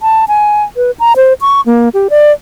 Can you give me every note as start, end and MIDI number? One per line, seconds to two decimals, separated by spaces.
0.02 0.25 81
0.28 0.64 80
0.77 0.91 71
0.99 1.13 82
1.16 1.33 72
1.41 1.61 85
1.66 1.89 58
1.94 2.08 67
2.10 2.32 74